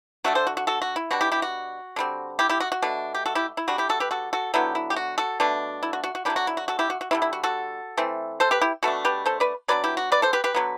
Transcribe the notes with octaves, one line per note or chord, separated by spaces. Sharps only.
D3 A3 D4 F#4
A4 C5
F#4
F#4
F#4 A4
F#4
E4
B2 G3 D4 F#4
E4 G4
E4 G4
F#4
D3 G3 C4
E4 G4
E4 G4
F#4
F#4
B2 A3 D4
G4
F#4 A4
E4 G4
E4
D3 G3 D4 F#4
E4 G4
F#4 A4
G4 B4
F#4 A4
F#4 A4
D3 F#3 B3 E4 G4
E4
G4
F#4
F#4 A4
B2 A3 D4
E4
F#4
F#4
F#4
D3 F#3 B3 D4 E4 G4
F#4
E4
F#4
F#4 A4
E4 G4
F#4
F#4
D3 G3 C4 E4
E4
F#4
F#4 A4
E3 A3 C4
A4 C5
G4 B4
E4 G4
B2 A3 D4 F#4 A4
G4 B4
A4 C5
B4 D5
F#3 B3 D4 B4 D5
E4 G4
F#4
B4 D5
A4 C5
G4 B4
G4 B4
D3 F#3 B3